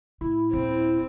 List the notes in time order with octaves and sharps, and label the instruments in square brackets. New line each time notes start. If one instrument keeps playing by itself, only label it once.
[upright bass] A2 [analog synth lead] E4
[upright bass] D#1 [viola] C4